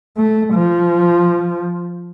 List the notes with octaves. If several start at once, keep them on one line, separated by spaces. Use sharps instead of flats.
A3
F3